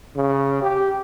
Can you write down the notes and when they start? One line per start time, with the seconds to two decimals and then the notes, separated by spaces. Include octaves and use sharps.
0.16 C#3
0.62 G4